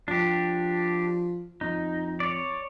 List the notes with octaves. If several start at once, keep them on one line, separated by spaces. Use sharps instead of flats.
F3 D4 G4
F2 D#4
C#5 D5